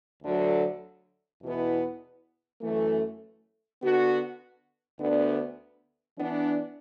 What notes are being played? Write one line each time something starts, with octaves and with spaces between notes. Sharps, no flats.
D2 D3 F#3 D4 A4
E2 B2 B3 E4 B4
F#2 E3 A3
D3 B3 F#4
D2 D3 B3 D4
E3 B3 D4